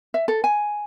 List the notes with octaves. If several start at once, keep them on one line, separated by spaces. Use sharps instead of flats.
E5
A4
G#5